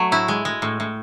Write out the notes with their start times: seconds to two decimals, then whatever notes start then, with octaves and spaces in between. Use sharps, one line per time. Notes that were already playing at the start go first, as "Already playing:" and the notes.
Already playing: F#3 A3
0.12 A2 E4
0.28 G#3
0.45 G#3
0.62 A2
0.80 A2